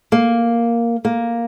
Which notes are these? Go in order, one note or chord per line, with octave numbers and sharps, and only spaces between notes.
A#3
A#3